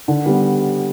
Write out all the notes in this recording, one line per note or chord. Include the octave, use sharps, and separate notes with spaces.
D3
G3 B3